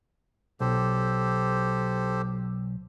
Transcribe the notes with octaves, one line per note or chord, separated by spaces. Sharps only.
B1 G4 A4 C5